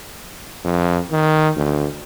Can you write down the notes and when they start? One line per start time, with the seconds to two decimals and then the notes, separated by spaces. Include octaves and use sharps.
0.64 F2
1.11 D#3
1.56 D2